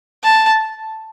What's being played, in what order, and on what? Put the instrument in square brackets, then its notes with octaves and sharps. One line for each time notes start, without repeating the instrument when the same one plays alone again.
[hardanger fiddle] A5